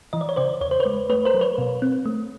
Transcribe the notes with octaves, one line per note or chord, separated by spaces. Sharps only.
E3 D#5
D5
C#5
C#3 C5 D5
E2 C#5
C5
B4 C#5
G#3
A3 B4 C#5
A#4 C5
F#3
B4 C#5
B2
C4
A3